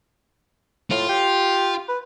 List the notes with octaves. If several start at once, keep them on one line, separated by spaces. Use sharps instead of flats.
A2 F4
G4
B4